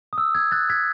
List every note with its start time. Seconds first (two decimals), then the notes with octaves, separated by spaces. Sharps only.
0.13 D#6
0.18 E6
0.35 E6 G#6
0.52 F#6 A6
0.70 G#6 B6